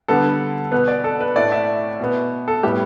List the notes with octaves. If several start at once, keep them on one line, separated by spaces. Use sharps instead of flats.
D3 G3 B3 A4
B2 B3 B4
D5
A4
B4
A2 A3 D5
E5
B2 B3
A4
A2 G3 B3 G4